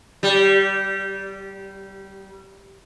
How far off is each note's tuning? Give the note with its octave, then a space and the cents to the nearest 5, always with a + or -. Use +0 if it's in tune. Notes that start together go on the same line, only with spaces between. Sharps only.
G3 -20